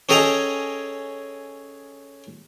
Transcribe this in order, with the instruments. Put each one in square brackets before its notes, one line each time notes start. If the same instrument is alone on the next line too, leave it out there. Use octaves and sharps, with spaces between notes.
[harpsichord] C#4 G#4 A4 D#5 G5 A#5